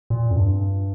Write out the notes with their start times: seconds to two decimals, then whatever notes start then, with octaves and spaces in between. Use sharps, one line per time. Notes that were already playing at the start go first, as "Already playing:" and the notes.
0.10 A#2
0.31 F2
0.36 G2